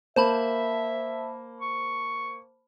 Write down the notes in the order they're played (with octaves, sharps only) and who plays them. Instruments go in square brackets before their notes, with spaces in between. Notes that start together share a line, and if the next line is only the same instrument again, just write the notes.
[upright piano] A#3 [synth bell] C5 A5 B5 [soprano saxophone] E5
[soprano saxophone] C#6